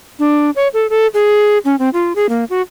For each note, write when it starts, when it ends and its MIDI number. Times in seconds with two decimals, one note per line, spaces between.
0.19 0.50 62
0.56 0.68 73
0.74 0.87 69
0.90 1.07 69
1.14 1.58 68
1.65 1.76 61
1.79 1.89 60
1.93 2.13 65
2.16 2.29 68
2.29 2.44 58
2.50 2.62 66